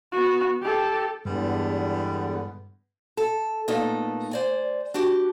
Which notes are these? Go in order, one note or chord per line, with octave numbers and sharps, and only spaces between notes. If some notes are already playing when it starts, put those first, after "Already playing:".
B3 F#4
G4 A4
E2 G2 D3 G3 G#3 B3
A4
A#2 A3 B3 D#4 A4
C5 D5 G#5
D4 F#4 G4